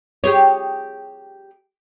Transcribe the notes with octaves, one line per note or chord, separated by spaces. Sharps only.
G4 G#4 C#5